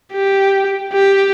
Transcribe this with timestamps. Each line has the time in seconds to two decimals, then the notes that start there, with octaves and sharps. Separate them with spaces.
0.13 G4
0.93 G4